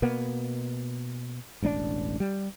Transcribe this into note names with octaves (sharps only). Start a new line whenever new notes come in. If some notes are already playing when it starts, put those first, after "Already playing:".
B2 A#3 B3
E1 A1 C4 D4
G3